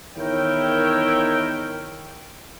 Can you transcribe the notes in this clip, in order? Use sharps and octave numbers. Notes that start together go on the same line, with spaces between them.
E2 D#3 E4 A#4 C#5 G5